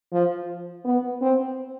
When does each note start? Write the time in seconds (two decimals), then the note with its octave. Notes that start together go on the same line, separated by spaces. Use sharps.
0.12 F3
0.85 B3
1.21 C4